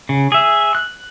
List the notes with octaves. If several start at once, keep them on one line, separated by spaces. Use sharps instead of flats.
C#3
G#4 E5
F#6